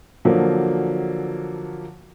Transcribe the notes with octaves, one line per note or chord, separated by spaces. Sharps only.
D3 F3 F#3 A#3